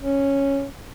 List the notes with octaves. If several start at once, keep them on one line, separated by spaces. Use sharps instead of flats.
C#4